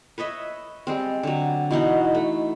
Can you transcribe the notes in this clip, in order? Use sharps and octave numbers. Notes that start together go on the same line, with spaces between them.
B4 C#5 D#5 E5
G3 G#3 C4
D3 F#3
B2 E3 D#4 F#4
A3